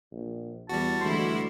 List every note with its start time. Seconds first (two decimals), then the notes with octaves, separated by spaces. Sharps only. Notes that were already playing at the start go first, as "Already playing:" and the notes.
0.12 A#1
0.69 E2 G3 F#4 A5
1.01 D2 E3 G#3 E4 C6